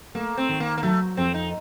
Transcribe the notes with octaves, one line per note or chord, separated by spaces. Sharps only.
A3 A#3
C4
D#3
A#3
A#3
F#3 A3
F2 C4
D#4